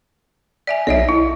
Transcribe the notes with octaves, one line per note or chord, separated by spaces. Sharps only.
D5 E5 G#5
B1 C#5 D#5 E5
E4